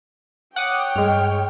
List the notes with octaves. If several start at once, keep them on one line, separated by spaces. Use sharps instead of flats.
C#5 F#5 G5 D6 D#6
G2 G#3 F6